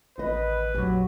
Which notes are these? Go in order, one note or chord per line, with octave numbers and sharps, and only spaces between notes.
A1 D#3 B4 D#5
A#1 F2 F#3 G4